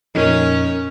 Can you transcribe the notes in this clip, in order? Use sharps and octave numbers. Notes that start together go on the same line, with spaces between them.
F2 A#2 F3 C#4 D#4 A#4